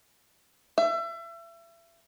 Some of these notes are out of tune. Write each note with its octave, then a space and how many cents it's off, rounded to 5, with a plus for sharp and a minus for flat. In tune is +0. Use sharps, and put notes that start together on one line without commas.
E5 +30